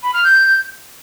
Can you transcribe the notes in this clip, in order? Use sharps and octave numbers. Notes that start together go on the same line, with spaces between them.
B5
F6
G6